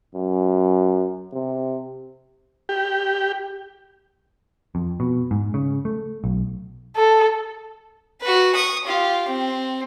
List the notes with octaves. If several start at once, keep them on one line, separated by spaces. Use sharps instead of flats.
F#2
C3
G4
F2
B2
G#2
C#3
A3
B1
A4
F#4 B4
C#6 D#6
F4 G4
C4